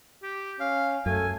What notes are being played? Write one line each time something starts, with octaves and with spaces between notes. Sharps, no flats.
G4
C#4 F5
F#2 A3 G#5